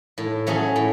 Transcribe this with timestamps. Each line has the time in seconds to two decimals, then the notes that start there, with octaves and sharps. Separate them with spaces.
0.18 A2
0.47 F#3 A3 C#4 G#4
0.76 A2